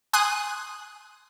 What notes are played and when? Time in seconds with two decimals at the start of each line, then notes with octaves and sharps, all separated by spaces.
0.13 G#5 C6 D#6 F#6